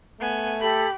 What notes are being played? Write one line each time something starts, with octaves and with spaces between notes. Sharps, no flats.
A3 B3 G#5
G4 A4 B5